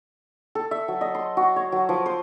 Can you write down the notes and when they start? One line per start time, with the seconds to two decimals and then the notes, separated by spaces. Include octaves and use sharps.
0.55 A4
0.71 E5
0.88 F#3
1.01 D#5
1.15 C6
1.37 F#4
1.56 C#5
1.72 F#3
1.89 F3
2.06 C5